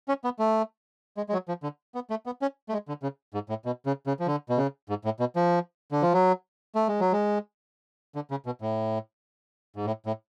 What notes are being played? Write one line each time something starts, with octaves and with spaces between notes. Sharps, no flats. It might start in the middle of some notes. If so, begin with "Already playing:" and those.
C#4
B3
A3
G#3
G#3
F#3
F3
D3
B3
A3
B3
C#4
A3
G#3
D3
C#3
G#2
A2
B2
C#3
C#3
F3
D3
B2
C#3
G#2
A2
B2
F3
D3
F3
F#3
A3
G#3
F#3
G#3
D3
C#3
B2
A2
G#2
A2
A2